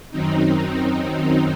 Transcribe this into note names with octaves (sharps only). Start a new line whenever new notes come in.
F#2 D#3 F#3 C4 D#4